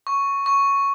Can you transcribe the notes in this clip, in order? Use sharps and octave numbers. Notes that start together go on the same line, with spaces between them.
C#6
C#6